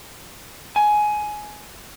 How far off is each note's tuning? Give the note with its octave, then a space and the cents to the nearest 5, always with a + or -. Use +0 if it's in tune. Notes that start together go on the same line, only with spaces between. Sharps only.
G#5 +15